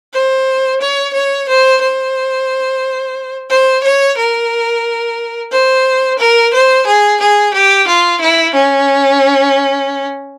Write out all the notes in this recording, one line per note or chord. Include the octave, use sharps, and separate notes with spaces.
C5
C#5
C#5
C5
C5
C5
C#5
A#4
C5
A#4
C5
G#4
G#4
G4
F4
E4
C#4